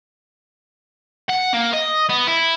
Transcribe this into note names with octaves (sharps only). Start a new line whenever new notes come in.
F#5
A#3
D#5
B3
E4